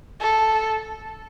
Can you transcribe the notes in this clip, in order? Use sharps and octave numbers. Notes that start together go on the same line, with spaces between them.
A4